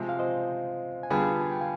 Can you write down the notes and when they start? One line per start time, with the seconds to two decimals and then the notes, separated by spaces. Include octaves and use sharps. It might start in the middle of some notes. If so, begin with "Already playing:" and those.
Already playing: C3 F3 G#3
0.09 F5
0.19 C5 D#5
1.03 G#5
1.10 D3 G3 B3 F4 G#4 G5 B5
1.41 G#5
1.52 G5
1.61 F5 G#5